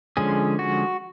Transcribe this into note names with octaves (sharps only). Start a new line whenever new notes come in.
D3 F3 G#3 C#4 G#4
F#4